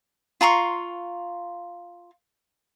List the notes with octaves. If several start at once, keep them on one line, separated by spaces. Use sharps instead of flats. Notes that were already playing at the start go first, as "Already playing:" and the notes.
F4 A#5 C6 C#6